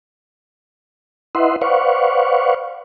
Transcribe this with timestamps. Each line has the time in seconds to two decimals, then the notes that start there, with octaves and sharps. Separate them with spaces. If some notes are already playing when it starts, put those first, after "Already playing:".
1.35 E4 B4 D#5 E5 F#5 C6
1.62 B4 C5 D5 F5 F#5 C#6